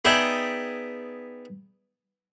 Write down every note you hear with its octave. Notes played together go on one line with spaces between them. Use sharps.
B3 D#4 G#4 D5 E5 G5